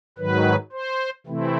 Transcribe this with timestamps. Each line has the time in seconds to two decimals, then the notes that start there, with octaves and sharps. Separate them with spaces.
0.18 G#2 D#3 F#3 B4
0.72 C5
1.27 C3 E3 A3 C4 E4